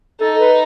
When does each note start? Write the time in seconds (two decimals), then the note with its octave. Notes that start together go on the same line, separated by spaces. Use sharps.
0.20 D#4 A4
0.39 B4